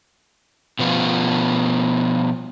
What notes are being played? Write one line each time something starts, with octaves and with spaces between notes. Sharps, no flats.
B2 F3 B3 F4